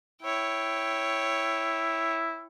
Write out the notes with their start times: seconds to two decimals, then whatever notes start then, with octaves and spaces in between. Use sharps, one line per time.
0.23 E4 C#5 G5